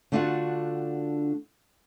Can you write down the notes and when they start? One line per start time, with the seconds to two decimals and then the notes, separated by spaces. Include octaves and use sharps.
0.12 D3 A3 D4 F4 F#4 F#5